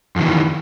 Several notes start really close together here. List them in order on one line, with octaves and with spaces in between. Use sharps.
F2 D#3 E3